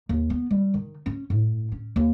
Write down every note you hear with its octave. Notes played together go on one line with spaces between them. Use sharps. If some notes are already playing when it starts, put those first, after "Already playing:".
D#2
B3
G3
D#3
C#4
A2
C#4
D#2